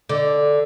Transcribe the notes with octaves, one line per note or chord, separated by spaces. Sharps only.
D3